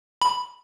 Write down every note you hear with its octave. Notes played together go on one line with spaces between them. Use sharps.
B5